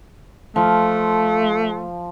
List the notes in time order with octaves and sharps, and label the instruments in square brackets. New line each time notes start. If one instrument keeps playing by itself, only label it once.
[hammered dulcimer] F3 [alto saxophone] A3